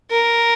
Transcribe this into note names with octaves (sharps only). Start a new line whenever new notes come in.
A#4